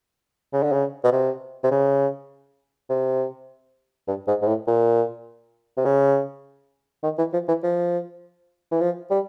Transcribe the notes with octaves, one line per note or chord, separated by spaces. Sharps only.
C#3
D3
C#3
B2
C3
C3
C#3
C3
G2
G#2
G#2
A2
A#2
C3
C#3
D#3
E3
F3
E3
F3
E3
F3
G3